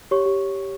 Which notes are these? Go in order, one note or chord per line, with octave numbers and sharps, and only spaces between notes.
G4 C#5 C#6
G4